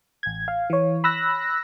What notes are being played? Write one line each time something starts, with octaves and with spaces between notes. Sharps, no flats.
A1 G#6
F5
E3 C#5
B5 E6 F#6 A#6